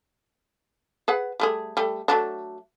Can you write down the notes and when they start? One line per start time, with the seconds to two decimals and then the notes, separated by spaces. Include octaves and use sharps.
1.08 G#4 B4 F#5
1.40 G3 A3 G#4
1.77 G3 A3
2.08 F#3 A3 D4